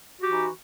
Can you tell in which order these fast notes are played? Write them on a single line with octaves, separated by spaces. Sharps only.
F#4 G4 E3 D#4